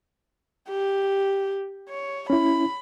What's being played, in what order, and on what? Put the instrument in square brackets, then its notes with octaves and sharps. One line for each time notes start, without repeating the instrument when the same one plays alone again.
[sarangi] G4
C#5
[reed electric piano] C#4 E4 [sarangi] B5